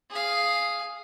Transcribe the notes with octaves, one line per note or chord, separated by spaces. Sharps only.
G#4 F5